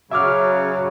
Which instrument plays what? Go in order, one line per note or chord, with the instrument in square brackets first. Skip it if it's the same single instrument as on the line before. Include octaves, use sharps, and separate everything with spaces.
[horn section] C#3 F#3 [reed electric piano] E5 D6 F6